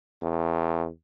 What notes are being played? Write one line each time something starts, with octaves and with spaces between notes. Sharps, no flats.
E2